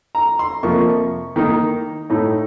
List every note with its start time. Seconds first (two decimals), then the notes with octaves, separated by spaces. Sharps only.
0.15 A#5
0.39 C6
0.63 F2 C3 F3 A#3 C#6
1.36 D#3 A#3 D#4
2.10 A2 A3 D#4